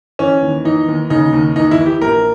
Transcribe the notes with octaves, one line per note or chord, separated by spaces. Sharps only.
E3 C#4
D#2
E3 D#4
D#2
C#3 D#4
D#2
E3 D#4
E4
E3
G4
A#1 A#4